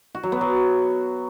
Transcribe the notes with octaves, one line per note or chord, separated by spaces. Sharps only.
F#4
F#3
B3
F#3